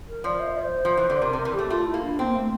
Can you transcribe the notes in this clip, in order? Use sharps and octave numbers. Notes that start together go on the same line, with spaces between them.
A#4
F3 D5
E5
D5
C5
F3
E3
D3
C3 A#4
C3
A#4
E3
G4
A3
A3 F4
E4
A#3
D4
A#3 C4
A3